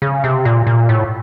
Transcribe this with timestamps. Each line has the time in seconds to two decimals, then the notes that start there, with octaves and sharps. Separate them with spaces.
0.02 C#3
0.24 C3
0.45 A#2
0.67 A#2
0.89 A2